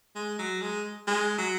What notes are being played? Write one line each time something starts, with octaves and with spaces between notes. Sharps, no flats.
G#3
F#3
G#3
G#3
F#3